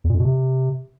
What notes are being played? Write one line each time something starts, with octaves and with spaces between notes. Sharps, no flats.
E2
A#2
F2
B2
C3